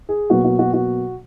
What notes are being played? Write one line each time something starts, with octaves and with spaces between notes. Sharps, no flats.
G#4
B2 F#3 A#3 F#4
F#4
F#4
F#4